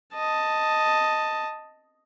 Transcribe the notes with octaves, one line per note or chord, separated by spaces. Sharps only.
D#5 A5